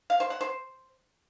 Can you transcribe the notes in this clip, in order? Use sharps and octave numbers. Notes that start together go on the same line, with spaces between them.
F5
C5
F#5
C5